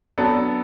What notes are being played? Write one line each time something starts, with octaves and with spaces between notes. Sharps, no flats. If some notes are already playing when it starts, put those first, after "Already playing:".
F#3 B3 D4 A4